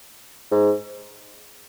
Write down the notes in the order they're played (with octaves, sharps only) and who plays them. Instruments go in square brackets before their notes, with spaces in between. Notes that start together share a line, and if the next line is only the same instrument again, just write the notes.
[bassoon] G#2